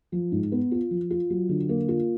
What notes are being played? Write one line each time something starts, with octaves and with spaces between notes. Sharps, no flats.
F3
G#2
B3
F4
F3
F4
F#3
D3
A#3
F4